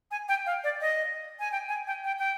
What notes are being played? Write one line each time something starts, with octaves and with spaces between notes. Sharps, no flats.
G#5
G5
F5
D5
D#5
G#5
G5
G#5
G5
G5
G5